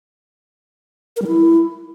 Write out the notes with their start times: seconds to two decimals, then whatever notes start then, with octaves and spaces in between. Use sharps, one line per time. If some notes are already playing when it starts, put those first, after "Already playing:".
1.16 A#4
1.22 G3
1.27 E4